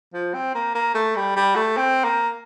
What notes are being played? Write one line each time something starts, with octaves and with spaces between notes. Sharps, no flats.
F3
C4
A#3
A#3
A3
G3
G3
A3
C4
A#3